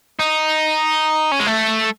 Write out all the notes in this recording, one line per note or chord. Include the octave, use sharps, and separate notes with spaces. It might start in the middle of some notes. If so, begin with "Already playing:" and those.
D#4
C#4
G#3
A3